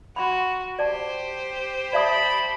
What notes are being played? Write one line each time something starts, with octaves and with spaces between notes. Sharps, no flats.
F#4 B5 C6
G4 C5 D5 A5
D5 E5 A5 B5 D#6